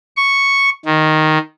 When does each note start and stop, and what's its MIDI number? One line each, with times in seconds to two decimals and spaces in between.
0.17 0.69 85
0.85 1.38 51